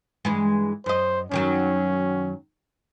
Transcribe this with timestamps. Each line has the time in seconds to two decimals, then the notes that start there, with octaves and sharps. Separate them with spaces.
0.25 G2 E3 G#3
0.86 F#2 C5 D#5
1.31 F#2 D#3 F#3 C#4